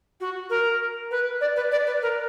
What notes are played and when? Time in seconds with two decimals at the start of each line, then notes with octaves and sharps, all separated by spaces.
0.20 F#4
0.50 A#4
1.11 B4
1.41 D5
1.56 B4
1.71 D5
1.86 B4
2.02 A#4